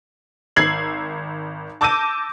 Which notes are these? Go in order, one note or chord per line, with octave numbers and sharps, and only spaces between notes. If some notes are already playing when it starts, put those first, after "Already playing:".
G#1 E6 G#6 C7 F#7
A5 D6 E6 G6 A#6 D#7